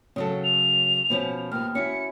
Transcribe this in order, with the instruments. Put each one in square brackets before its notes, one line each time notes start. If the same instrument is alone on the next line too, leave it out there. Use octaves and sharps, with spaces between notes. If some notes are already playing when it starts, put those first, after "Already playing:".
[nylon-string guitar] C#3 F#3 A4
[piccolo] F7
[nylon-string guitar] B2 F3 C#4
[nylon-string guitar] D#2 B3 [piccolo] F6
[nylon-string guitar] C#4 E4 F#4 [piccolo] C#7